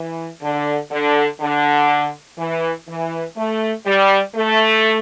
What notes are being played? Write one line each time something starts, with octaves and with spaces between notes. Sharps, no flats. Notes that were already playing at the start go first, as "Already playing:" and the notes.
Already playing: E3
D3
D3
D3
E3
E3
A3
G3
A3